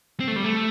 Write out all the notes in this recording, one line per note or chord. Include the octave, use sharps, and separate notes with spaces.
C4
A3
G3
A3